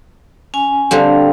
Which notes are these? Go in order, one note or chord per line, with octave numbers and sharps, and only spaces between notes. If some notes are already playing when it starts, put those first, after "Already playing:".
C#4 G#5
D3 G3 C4 F5